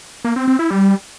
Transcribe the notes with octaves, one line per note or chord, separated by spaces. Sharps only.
A#3
C4
C4
E4
G3